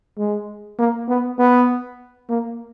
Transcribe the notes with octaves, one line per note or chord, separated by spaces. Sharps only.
G#3
A#3
B3
B3
A#3